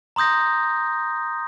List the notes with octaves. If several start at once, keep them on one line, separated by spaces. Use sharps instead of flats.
A#5 C6 D#6 G6 A#6